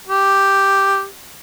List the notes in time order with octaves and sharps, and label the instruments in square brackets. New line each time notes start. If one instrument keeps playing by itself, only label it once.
[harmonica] G4